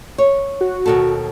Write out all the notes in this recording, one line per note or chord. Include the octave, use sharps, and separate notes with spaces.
C#5
F#4
D#2 B2 A4